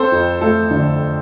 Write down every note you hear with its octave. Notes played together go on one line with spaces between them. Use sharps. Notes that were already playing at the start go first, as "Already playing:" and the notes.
Already playing: C4 A4 C5
F2
A3 A4
D3